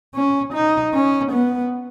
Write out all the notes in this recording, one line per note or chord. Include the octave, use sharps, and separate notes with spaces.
C#4
D#4
C#4
B3